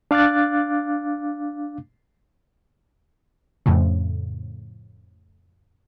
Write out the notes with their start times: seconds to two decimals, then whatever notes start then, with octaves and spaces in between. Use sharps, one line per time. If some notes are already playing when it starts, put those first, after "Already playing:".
0.11 D4 F5 D6 F#6 A6
3.66 F2 A2 C#3